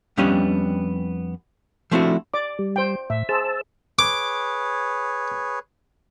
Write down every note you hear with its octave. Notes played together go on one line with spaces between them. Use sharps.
F2 G3 B3 C#4 D4 D#5
F3 A3 C4 D4 E4 F#4
D5 D6
G3
C5 G5
A2 E5
G#4 C5 A5 E6
G#4 B4 C#5 D6